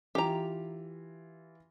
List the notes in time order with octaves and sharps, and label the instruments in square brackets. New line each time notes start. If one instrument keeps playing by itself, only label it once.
[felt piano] E3 F4 [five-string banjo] G4 A#5